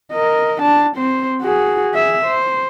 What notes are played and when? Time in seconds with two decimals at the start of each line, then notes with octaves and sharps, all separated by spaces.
0.12 A#4 D#5
0.62 D4 A5
0.96 C4 C5
1.42 F#4 G#4
1.95 G#4 E5
2.26 C5